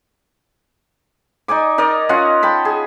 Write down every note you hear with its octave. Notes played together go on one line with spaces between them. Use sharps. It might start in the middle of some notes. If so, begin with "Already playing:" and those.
D#4 D5 G#5 D6
D#4 A#4 D5 D#5
C#4 F4 D#5 F#5
G5 A5 B5
G#4